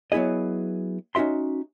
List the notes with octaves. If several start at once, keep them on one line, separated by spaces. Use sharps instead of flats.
F#3 B3 E4 G#4 D#5
C#4 D#4 F#4 E5 C6